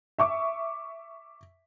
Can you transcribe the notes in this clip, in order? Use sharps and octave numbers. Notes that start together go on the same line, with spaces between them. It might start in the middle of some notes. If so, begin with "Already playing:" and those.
E5 C#6 D6